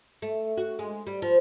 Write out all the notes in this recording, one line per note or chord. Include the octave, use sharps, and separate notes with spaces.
A3
F#4
G#3
G3
F3